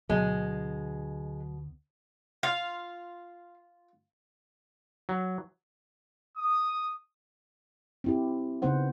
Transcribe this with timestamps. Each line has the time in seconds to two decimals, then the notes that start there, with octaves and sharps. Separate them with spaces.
0.09 D2 B2 D3 F#3 G#3
2.43 F4 F5
5.09 F#3
6.37 D#6
8.04 C4 E4 G4
8.62 C#3 B3 D#4 C5 F#5